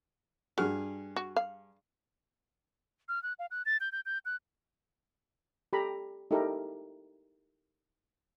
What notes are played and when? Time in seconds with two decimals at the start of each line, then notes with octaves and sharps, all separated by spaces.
0.58 G2 F#4 G#4 F6
1.16 F#4
1.36 F5
3.09 F6
3.23 F#6
3.39 F5
3.51 F#6
3.66 A6
3.80 G6
3.92 G6
4.06 G6
4.25 F#6
5.73 G4 A4 A#5 B5
6.31 D#4 E4 G4 A4 A#4